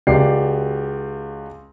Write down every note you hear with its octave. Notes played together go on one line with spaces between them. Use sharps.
C#2 F#4 G4 D5 C7